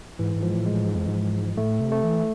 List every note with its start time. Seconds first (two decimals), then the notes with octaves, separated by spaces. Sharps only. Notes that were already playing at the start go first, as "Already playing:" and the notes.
0.19 G#2 E3
0.36 G#2
0.43 F3
0.54 A2
0.66 G#3
0.71 A2
0.83 G#2
0.95 F2
1.08 G#2
1.58 A2 A3
1.80 C3
1.92 A3
2.04 E3